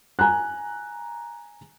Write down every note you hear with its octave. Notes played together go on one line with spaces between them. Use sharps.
G#5 A#5 F#6